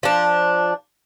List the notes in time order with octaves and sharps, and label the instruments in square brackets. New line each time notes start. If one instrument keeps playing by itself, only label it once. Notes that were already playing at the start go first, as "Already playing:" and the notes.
[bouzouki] F3 D4